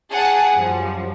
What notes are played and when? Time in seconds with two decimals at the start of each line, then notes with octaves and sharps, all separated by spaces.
0.11 G#4 F#5 A5
0.53 F#2 F3 G3